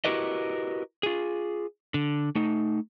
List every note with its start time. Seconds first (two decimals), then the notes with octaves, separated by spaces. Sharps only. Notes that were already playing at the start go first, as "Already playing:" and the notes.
0.05 E4 F#4 G4 A#4 B4 D#5
1.03 F4 G#4
1.94 D3
2.35 A3 D#4